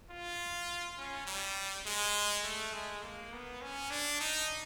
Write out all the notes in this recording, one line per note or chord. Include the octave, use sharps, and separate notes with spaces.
F4
C#4
G3
G#3
A3
G#3
A#3
B3
C#4
D4
D#4